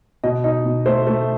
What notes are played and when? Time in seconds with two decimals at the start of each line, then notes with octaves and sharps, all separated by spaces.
0.24 B2 D#5
0.44 D#4
0.65 B2
0.86 A3 C5
1.07 A3